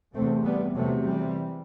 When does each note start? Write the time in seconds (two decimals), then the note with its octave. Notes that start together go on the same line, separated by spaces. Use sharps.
0.14 E2 C3 A3 C4
0.44 G3 B3
0.75 E2 C3 F#3 A3
1.05 E3 G3